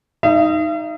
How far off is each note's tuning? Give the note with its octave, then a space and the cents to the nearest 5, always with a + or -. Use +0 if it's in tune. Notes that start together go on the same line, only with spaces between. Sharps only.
D#4 +0 E5 +45